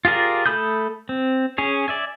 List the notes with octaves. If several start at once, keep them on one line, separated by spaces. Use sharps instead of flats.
F4 G4 G#4 A#4 D5
A3 A4 B5 D#6 G6
C4
C#4 G#4 C#5
D5 E5 G#5